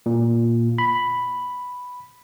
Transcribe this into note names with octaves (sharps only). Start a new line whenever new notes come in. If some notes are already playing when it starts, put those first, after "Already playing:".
A#2
B5